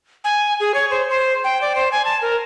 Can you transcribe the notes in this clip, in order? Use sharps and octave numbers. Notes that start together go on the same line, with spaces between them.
G#5
G#4
C#5
C5
C5
G5
D5
C5
G#5
A5
A#4